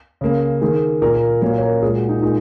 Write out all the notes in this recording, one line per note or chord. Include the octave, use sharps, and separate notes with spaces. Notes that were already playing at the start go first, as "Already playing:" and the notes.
C#3 A#3
D#3 A#3 G#4
A#2 A#3 A#4
A#4
A#2 F#3 A#3 C#5
C#5
A#4
A#2 G#3 G#4
F#4
D#4
A#2 G#3 D#4